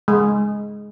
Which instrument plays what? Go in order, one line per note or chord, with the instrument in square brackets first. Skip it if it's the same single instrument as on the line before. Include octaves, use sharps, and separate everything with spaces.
[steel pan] G#3